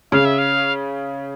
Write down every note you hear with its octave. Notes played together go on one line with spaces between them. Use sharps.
C#3 F5
E5
F5